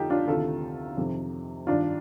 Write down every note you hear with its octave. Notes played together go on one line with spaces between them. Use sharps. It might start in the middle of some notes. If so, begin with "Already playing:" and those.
Already playing: F2 D3 D#4 F4 G4 A4
D4 F4
D2 C3 D#3 F4 A4
F2 C3 D#3
G2 D#3 D4 F4